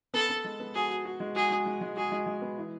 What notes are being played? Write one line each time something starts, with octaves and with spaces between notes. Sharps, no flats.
B3 A4
B3
G#3
B3
F#4 G#4
F#4
F#4
G#3
F#4 G#4
G#3
G#3
G#3
F#4 G#4
G#3
G#3
B3
E3